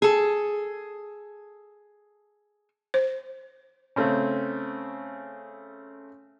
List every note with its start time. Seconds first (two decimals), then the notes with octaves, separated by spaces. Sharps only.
0.02 G#4 A4
2.94 C5
3.96 C#3 A3 C4 C#4